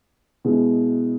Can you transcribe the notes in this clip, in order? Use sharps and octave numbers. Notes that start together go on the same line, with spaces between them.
B2 G#3 E4 G#4